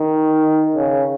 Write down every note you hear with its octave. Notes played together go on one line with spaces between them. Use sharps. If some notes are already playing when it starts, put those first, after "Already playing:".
Already playing: D#3
C#3